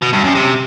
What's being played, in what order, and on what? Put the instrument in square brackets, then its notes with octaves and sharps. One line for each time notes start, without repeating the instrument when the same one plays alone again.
[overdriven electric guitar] B2
G2
F#2
C3